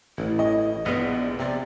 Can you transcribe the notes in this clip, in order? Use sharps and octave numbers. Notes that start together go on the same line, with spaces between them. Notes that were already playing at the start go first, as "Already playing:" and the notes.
A1 E4
D#5
A#1 B3 B4 D#5 F5
C3 D5